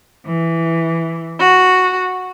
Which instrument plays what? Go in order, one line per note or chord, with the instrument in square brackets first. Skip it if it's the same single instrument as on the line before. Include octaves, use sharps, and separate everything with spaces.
[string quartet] E3
F#4